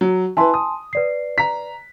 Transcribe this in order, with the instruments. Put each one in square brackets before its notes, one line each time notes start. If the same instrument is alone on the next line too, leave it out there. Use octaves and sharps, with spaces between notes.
[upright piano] F#3
[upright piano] E4 B4 [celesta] G#5 A5 C6
[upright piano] D#6
[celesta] B4 D5 C7
[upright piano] A#5 B6